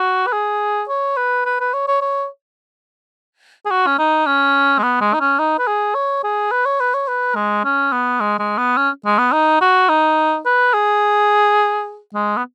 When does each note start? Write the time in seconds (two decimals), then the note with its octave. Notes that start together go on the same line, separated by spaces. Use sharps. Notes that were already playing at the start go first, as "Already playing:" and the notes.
Already playing: F#4
0.27 B4
0.33 G#4
0.88 C#5
1.17 B4
1.45 B4
1.60 B4
1.73 C#5
1.87 C#5
2.01 C#5
3.66 G#4
3.70 F#4
3.86 C#4
3.98 D#4
4.26 C#4
4.78 G#3
4.83 B3
5.01 G#3
5.13 D#4
5.20 C#4
5.39 D#4
5.58 B4
5.67 G#4
5.95 C#5
6.23 G#4
6.51 B4
6.65 C#5
6.80 B4
6.94 C#5
7.08 B4
7.35 G#3
7.64 C#4
7.92 B3
8.20 G#3
8.39 G#3
8.58 B3
8.77 C#4
9.05 G#3
9.18 B3
9.32 D#4
9.61 F#4
9.89 D#4
10.45 B4
10.74 G#4
12.14 G#3
12.37 B3